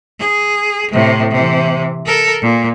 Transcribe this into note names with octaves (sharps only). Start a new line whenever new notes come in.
G#4
A2 C3
C3 E3
A4 A#4
A#2